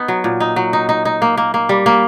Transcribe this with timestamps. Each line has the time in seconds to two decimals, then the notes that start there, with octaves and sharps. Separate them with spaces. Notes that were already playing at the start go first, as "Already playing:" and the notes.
Already playing: B3 D#4
0.08 F#3
0.24 A#2
0.40 D#4
0.56 F#3
0.73 D#4
0.89 D#4
1.05 D#4
1.22 A#3
1.37 A#3
1.54 A#3
1.69 G3
1.86 A#3